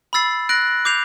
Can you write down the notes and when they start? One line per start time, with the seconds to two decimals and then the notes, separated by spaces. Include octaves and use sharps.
0.13 B5 E6 A6 C7
0.49 F#6 A#6 D7 F#7
0.85 D6 G6 C7 F7